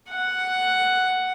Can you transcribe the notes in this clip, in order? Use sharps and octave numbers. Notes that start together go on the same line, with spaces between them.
F#5